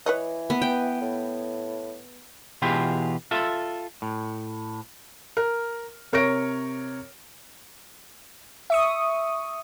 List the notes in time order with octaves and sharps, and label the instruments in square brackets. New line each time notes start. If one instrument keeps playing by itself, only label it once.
[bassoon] E3 [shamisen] B4 C#5 D#5
[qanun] B3
G5
[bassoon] A2
[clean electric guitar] B2 E3 F4 G4 G#4
F4 A4 E5
A2
[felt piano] A#4
C3 A#4 C#5 C#6 A#6 D7
[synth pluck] E5 C#6 D#6